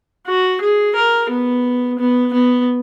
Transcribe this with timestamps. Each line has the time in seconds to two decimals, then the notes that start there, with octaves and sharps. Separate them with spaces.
0.27 F#4
0.61 G#4
0.95 A#4
1.30 B3
1.99 B3
2.33 B3